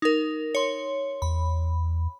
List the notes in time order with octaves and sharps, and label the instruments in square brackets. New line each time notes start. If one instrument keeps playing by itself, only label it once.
[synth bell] D#4 A#4
C#5 C6
[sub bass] E2 [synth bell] B5